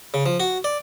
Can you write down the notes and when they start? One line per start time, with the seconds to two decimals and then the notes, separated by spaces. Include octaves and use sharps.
0.14 C#3
0.26 F3
0.40 F#4
0.64 D5